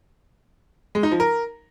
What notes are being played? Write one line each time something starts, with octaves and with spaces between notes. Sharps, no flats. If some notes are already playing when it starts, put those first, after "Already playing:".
G#3
D#4
F3
A#4